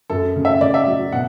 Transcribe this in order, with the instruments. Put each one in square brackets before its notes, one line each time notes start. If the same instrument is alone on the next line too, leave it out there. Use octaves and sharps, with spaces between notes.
[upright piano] F#2 A4
C#3
E5
C#3 D5
E5
F#3
B2 F#5